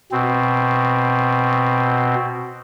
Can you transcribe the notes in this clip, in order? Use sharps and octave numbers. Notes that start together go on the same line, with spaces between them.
B2 C4